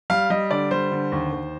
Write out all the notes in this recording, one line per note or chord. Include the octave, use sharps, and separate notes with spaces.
G3 F5
G3 D#5
D3 D5
G3 C5
D3
D#2
D#2